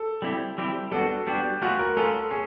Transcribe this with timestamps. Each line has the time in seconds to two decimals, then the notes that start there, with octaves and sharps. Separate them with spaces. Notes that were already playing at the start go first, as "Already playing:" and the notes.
Already playing: A4
0.22 G3 C4 E4 G4
0.58 G3 C4 E4 G4
0.92 G3 B3 D4 F#4 A4
1.27 G3 B3 D4 F#4 G4
1.62 A3 C#4 F4 F#4 G#4 B4
1.79 A#4
1.97 A3 C#4 F4 G#4 A4 B4
2.31 C#4 G#4